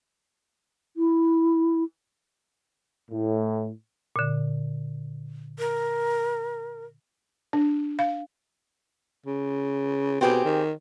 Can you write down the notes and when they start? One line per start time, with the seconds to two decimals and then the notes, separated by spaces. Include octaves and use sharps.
0.97 E4
3.11 A2
4.16 A#2 D3
5.59 A#4
7.53 D4
7.99 F5
9.26 C#3
10.21 B2 C4 G4 G#4
10.44 D#3